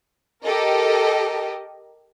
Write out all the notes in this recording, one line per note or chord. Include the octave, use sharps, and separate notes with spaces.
G4 A4 A#4 D#5